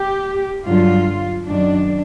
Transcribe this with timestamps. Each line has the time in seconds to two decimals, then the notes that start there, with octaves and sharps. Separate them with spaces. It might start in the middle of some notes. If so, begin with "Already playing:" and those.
Already playing: G4
0.67 G2 D3 F#3 F4
1.46 F#2 D#3 F#3 D4